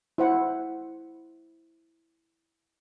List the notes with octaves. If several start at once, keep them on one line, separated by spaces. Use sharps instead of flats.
E4 C5 F#5